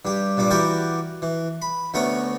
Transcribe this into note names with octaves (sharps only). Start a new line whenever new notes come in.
G2 G4
G2 A#2 G3 D6
E3 F#4 G4 A#4 B4 D5
E3
B5
D2 A3 B3 C#4 C#5 A#5